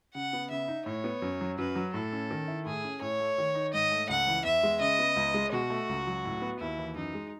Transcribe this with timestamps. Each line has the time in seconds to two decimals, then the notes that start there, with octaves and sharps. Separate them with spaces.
0.15 C#3 F#5
0.33 B3
0.51 C#3 E5
0.68 D#4
0.86 A2 C#5
1.04 B3
1.22 F#2
1.41 F#3
1.58 F#2 B4
1.76 F#3
1.94 A2 A4
2.13 C#4
2.31 D#3
2.48 E4
2.66 A2 G#4
2.84 C#4
3.01 A2 C#5
3.20 A3
3.38 D#3
3.55 D#4
3.74 G#2 D#5
3.92 A3
4.09 C#2 F#5
4.27 E3
4.45 E2 E5
4.63 G#3
4.80 C#3 D#5
4.99 B3
5.16 C#2
5.34 G#3
5.52 B2 F#4
5.70 A3
5.89 C#2
6.07 F#3
6.25 A2
6.42 B3
6.60 D#2 E4
6.79 E3
6.96 F#2 D#4
7.14 G#3